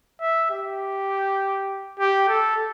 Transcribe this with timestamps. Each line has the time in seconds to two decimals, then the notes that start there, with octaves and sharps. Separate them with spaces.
0.21 E5
0.51 G4
2.00 G4
2.28 A4